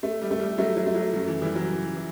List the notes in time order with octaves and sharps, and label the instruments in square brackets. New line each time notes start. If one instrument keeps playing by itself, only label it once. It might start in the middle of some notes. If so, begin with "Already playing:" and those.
[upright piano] A3
[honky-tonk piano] G3
[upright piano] A3
[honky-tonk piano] G3
[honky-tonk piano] F#3 [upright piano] A3
[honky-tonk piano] F#3
[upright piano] A3
[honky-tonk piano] F#3
[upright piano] F#2 [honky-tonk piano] F#3
[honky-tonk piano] E3
[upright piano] E3 [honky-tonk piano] G3
[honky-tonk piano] F#3
[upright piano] C#3
E3